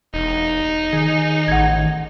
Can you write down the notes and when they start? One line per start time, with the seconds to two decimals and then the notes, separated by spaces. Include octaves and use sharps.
0.14 E1 D#4
0.93 D#3 G#4
1.48 A1 F#5 G#6